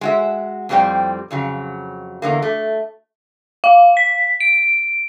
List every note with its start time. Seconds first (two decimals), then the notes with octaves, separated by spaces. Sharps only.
0.01 G#3 F#4 E5
0.69 F2 A2 G3 C4 C5 G5
1.31 F2 C#3 F#3
2.22 E2 D3 A#3
2.42 A3
3.64 F5
3.97 B6
4.40 D7